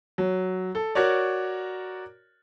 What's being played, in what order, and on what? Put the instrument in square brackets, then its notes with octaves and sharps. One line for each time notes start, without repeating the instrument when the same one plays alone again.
[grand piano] F#3
A4
F#4 A#4 C#5 D5